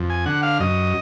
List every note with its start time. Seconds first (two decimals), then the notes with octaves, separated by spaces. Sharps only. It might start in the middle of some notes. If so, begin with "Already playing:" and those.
Already playing: F2
0.10 G#5
0.26 D3 F#5
0.43 F5
0.60 F#2 D#5